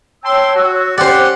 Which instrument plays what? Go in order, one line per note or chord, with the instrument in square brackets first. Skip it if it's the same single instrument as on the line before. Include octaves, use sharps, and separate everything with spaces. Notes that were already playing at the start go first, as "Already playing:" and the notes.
[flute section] C#5 E6 [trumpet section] G5 A5 C6
[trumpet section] F#4
[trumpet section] C#4 F#5 [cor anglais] G4 [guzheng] C5 D5